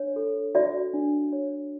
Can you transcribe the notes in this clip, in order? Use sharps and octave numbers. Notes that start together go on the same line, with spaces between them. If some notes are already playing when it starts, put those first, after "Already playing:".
Already playing: D4 C#5
A4
F#4 D5 E5
D4
C#5